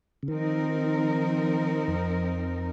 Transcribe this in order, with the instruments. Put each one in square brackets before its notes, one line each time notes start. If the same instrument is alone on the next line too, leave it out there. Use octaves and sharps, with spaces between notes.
[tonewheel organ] C#3
[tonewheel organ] D#3 [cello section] F3 C4 D#4 A#4
[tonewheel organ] F2